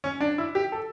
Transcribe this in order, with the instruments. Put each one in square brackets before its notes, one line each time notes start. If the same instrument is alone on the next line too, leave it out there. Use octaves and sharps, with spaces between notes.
[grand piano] C#4
D4
E4
G4
A4